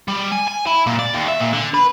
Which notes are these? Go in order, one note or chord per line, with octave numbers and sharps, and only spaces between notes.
G3
G#5
G#5
E4
A#2
D5
D#2
E5
A#2
D3
B4